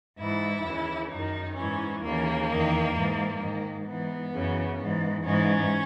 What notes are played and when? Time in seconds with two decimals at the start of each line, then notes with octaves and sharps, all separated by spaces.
0.18 G#2 E3 E4
0.64 D#2 C#3 E3
1.10 F#2 D#3 D#4
1.56 G#2 E3 C#4
2.02 D#2 C#3 E3 A#3
2.48 E2 D#3
2.94 G#2 E3
3.40 G#2 D#3
3.86 G#2 E3 B3
4.32 F#2 C#3 E3
4.78 G#2 E3
5.23 G#2 E3 C#4